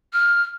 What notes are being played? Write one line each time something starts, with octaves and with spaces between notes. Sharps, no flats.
F6